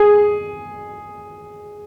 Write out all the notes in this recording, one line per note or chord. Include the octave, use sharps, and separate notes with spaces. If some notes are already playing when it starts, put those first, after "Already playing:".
Already playing: G#4